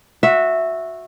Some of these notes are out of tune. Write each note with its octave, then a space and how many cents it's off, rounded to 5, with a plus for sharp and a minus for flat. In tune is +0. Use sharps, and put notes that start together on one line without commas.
F#4 -15 E5 +0